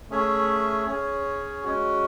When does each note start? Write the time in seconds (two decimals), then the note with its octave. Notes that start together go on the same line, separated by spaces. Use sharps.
0.10 A3 C#4 G#4 C#5 E5
0.87 C#4 G#4 C#5
1.64 G#3 C#4 F#4